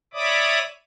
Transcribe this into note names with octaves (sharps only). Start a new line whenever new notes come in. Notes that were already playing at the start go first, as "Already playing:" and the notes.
C#5 D5 E5 B5 D6 D#6